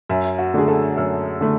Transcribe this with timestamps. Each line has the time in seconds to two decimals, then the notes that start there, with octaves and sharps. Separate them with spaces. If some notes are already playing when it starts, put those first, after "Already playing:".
0.09 F#2 E5
0.38 F#4
0.54 D3 A3 D4 G#4
0.68 A4
0.97 F#2
1.41 D3 A3